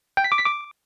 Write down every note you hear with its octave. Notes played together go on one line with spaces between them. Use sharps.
G5
B6
D6
B6
D6